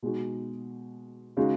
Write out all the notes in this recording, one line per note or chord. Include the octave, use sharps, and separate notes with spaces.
B2 G#3 D#4 F#4
C#3 G#3 D#4 F#4